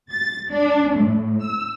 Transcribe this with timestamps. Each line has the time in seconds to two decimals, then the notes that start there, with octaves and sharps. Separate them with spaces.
0.10 A6
0.50 D4
0.95 A2
1.42 E6